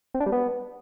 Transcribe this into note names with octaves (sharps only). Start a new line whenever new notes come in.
C4
D4
G3
B3